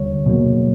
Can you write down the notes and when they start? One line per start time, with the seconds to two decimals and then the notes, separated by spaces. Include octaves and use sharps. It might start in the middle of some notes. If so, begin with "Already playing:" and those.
Already playing: D#2 D3 G3 C#5
0.26 B2 F#3 A#3